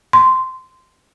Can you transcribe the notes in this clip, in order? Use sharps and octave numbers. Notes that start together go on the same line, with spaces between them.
C6